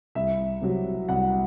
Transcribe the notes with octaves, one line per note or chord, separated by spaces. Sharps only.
C2 E5
C3 F#3
C2 F#5